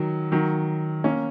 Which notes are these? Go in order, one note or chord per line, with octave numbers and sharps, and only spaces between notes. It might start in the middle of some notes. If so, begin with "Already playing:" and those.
Already playing: D#3 F#3
D#3 F#3
A#3 C#4